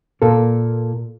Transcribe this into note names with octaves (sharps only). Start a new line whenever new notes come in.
A#2 A#3 A4